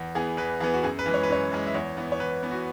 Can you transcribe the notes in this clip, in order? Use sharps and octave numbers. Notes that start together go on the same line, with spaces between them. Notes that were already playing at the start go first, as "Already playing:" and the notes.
Already playing: E2
E3 B3 G#4
E2 B4
E3 B3 G#4
F#4
F#2 G#4
B4
E3 G#3
C#5
B4
F#2 C#5
E3 G#3
E5
E2 C#5
E3 B3
C#5
E2 B4
E3 B3
F#4